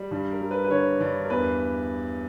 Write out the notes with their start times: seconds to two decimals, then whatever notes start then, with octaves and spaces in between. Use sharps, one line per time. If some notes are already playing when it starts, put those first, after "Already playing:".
Already playing: G3
0.11 G2
0.31 A#4
0.41 G3
0.51 B4
0.64 B4
0.70 D3 C#5
1.00 G2 D5
1.24 A#4
1.30 E2 B4